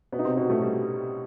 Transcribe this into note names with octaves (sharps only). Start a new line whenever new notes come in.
B2 B3
D#4
C3 C4
B2 B3
A2 A3
G3